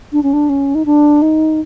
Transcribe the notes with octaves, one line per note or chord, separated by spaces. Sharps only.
D4
C#4
D4
C#4
D#4
D4
D#4